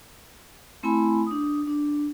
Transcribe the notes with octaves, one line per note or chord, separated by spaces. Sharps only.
A3 C4 E4 G#5 B5
D4 D#6
D4